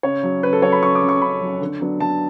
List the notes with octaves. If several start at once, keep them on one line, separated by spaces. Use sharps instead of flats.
C#3 C#5
F#3 C#4
C#3 B4
A4
F#3 C#4 C#5
B5
C#3 C#6
D6
F#3 C#4
C#6
C#3 B5
F#3 C#4
D3
F#3 B3 D4
D3 A5